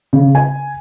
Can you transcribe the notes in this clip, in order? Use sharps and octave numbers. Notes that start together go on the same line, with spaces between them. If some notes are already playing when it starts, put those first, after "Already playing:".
C#3
G#5